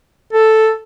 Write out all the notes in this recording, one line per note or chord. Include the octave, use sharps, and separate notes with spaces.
A4